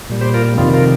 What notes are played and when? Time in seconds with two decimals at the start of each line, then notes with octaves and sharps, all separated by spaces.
0.09 A#2 G3
0.21 G4 C5
0.34 F4 A#4
0.57 F2 C3 D#3 G3 F4
0.74 F4 A#4